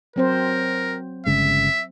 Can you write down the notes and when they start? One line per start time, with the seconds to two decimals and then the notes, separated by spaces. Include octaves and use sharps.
0.16 F#3 C4 A#4 C5
1.26 G1 C#3 G#3 E5